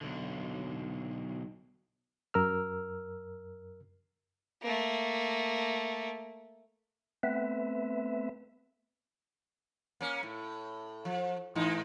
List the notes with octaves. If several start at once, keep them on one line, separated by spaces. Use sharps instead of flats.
B1 D3
F#2 A#4 E6 F6
A3 A#3
A3 B3 C4 B4 E5
A#3 C#4
A2
F3
G#2 E3 D#4